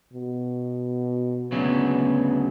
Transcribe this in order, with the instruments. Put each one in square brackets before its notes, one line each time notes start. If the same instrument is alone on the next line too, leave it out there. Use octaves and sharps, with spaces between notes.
[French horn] B2
[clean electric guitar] D2 C#3 F#3 [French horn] B3